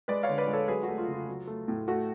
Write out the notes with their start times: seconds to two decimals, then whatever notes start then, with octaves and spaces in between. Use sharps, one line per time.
0.08 G#3 B4 D5
0.23 C#5 F5
0.29 D3
0.38 B4 D5
0.48 G#3
0.53 A4 C#5
0.68 F#3 G#4 B4
0.83 F#4
0.88 A3
0.98 F4
1.08 C#3 F4
1.28 F#3
1.47 A3
1.68 A2
1.88 A3 F#4